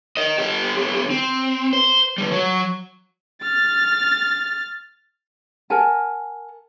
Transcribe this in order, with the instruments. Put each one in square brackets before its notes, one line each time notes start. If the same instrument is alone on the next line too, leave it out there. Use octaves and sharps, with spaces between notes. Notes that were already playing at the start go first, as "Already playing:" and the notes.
[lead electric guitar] A#4 D#5
D3 G4
C4
C5
D3 G3
F#3
[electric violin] F6 A6
[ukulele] A#4 F#5 G#5 A5